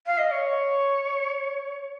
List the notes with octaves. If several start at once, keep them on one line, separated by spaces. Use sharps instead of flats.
F5
D#5
C#5